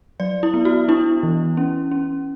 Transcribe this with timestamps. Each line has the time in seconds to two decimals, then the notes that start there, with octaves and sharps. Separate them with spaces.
0.20 F#3 D5
0.43 E4
0.54 B3
0.65 F#4
0.88 D4 E4
1.23 E3
1.57 C#4
1.91 C#4